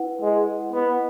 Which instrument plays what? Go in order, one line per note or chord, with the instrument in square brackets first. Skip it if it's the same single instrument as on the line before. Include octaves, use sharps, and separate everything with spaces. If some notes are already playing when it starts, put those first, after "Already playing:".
Already playing: [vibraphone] E4 B4 F#5
[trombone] G#3
[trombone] B3 [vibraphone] E4 B4 D#5 F#5